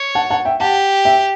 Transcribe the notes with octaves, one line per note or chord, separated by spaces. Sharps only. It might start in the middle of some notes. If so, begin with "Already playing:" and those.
Already playing: C#5
F#5 A5
F#5 A5
E5 G5
G4 F#5 A5
E5 G5